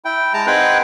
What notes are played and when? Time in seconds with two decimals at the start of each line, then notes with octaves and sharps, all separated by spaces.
0.05 E4 G5
0.34 G#3 A5 A#5
0.47 C4 D#4 G#4 B4 F#5 G5